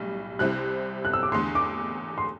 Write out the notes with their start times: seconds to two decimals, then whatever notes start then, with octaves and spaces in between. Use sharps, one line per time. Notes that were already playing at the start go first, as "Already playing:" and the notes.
Already playing: B1 A2 G3 D4
0.39 C2 C3 G3 C4 E4 F#6
1.05 F#6
1.13 E6
1.23 D6
1.32 E2 D3 A3 C6
1.55 D6
2.18 C6